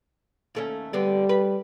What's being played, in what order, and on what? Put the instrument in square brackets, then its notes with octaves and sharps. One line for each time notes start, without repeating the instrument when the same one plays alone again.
[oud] D#2 A3 C#4
[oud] D3 B3 C4 [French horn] G3
[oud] B4